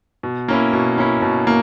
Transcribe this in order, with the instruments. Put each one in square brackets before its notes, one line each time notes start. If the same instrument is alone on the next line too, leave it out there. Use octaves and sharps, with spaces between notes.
[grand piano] B2
A#3 C#4 E4
B2
A#3 C#4 E4
B2
A#3